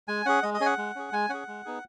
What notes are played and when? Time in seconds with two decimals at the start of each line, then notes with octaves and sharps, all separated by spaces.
0.08 G#3 G#5
0.26 C#4 G#4 F#5
0.43 G#3 D#5
0.54 D#5
0.60 C#4 G#4 G#5
0.66 F#5
0.78 G#3
0.95 C#4 G#4
1.12 G#3 G#5
1.29 C#4 G#4 F#5
1.48 G#3
1.65 B3 D#4 G#4